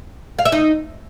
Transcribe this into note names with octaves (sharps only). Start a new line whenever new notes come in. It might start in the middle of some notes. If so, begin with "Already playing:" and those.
F5
E5
D#4